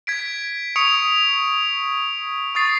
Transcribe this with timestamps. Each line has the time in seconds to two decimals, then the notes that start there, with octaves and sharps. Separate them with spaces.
0.07 G#6 B6 D7
0.76 C#6 D#6 C#7 D7 F7
2.55 C#6 D#6 A6 C7